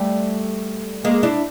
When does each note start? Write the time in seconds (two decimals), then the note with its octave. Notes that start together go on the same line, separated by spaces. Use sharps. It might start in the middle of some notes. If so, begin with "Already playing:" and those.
Already playing: G3 A3
1.05 G#3 A#3
1.23 D4 E4